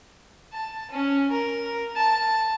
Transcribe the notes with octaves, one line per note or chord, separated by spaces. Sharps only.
A5
C#4
A#4
A5